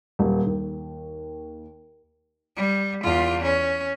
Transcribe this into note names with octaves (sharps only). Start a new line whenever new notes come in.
D#1
D#2
G3
E2 F4
C#4